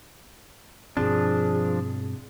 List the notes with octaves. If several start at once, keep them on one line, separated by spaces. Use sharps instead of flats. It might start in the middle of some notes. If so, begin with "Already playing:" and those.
G2 B2 F3 C4 D4 G#4